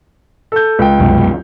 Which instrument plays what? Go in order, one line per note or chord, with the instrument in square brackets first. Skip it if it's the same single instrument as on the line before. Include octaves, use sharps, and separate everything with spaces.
[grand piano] A4 G6
C#2 G5
[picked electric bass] C2 F#2 B2